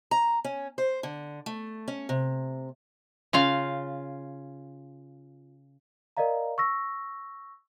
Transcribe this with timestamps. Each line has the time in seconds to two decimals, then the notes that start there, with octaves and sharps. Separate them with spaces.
0.11 A#5
0.44 C#4
0.78 C5
1.03 D3
1.46 A3
1.88 C#4
2.09 C3
3.33 C#3 F4 F5
6.17 A#4 D5 D#5 F5 A#5
6.58 C#6 E6 A#6